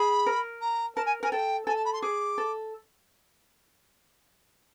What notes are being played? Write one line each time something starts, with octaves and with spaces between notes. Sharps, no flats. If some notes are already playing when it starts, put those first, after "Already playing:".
Already playing: G#4 B5
A#4
A#5
A#4 A5
G#5
A#4 G#5
A4 G5
A4 G#5
A5
B5
C6
G#4 D6
A4